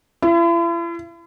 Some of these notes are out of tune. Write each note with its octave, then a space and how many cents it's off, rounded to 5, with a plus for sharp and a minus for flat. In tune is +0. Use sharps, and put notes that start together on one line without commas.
E4 +45